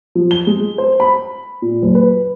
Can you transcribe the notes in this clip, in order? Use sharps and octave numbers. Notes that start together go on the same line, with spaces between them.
F3
G7
G#3
C5
B5
A#2
F#1
B4